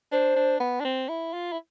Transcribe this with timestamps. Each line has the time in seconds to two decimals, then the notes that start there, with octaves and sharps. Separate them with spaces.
0.12 D4 C5
0.36 D4
0.60 B3
0.80 D4
0.85 C4
1.09 E4
1.33 F4
1.52 E4